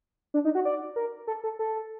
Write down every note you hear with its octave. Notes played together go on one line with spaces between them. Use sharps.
D4
D#4
F#4
D5
A#4
A4
A4
A4